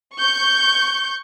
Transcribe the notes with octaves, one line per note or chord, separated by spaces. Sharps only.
C#6 G6